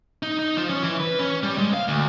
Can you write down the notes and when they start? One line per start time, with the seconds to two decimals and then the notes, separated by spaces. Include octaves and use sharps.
0.23 D#4
0.39 D#4
0.57 F3
0.69 C#4
0.83 E3
1.00 B4
1.19 C#4
1.43 G3
1.58 G#3
1.74 F5
1.88 D2